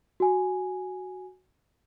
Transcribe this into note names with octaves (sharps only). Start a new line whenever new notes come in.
F#4 G#5